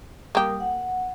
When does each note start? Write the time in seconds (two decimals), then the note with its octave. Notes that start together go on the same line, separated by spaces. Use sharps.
0.35 G3 A#3 G4 A#4 D#6
0.60 F#5